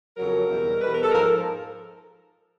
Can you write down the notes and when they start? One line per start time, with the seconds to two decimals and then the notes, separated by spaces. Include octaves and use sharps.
0.17 F2 C#3 F#3 A#4
0.49 E2 B2 G3
0.80 E2 B2 G3 B4
0.91 A#4
1.02 A4
1.12 G#2 F3 G#3 A#4
1.23 A4